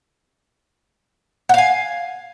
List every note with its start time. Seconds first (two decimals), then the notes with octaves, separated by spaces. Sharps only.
1.49 F#5
1.54 F5
1.58 G#5